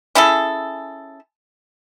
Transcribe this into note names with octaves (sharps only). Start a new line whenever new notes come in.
C#4 E4 G#4 A4